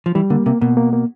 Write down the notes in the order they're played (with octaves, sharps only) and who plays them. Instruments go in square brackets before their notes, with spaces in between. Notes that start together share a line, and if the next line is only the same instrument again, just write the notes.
[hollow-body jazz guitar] F3
[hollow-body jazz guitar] E3 [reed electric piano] G3
[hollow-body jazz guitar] D3 [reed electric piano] A#3
[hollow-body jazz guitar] C3 [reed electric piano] A#3
[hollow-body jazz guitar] B2 [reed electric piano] A#3
[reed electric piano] A#3
A#3